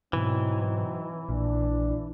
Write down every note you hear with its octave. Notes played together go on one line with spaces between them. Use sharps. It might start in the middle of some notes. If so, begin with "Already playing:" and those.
G#2 B2 E3 F#3 C4 D#4
A#1 A#2 D4